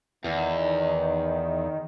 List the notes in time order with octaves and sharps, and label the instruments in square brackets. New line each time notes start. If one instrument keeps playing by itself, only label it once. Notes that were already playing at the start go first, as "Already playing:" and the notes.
[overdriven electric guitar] E2 [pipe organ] D#3